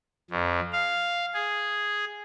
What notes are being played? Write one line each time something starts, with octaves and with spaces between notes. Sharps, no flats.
F2
F5
G#4